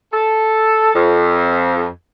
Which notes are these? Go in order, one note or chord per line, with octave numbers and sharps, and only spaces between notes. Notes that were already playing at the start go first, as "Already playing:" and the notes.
A4
F2